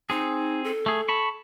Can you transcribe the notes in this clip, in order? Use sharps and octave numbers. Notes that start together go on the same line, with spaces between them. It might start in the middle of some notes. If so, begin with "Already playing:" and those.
C4 D#4 G#4
A4
A3 G#4
A5 B5 C#6